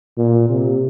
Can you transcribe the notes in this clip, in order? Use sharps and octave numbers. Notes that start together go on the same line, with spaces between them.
A#2
C3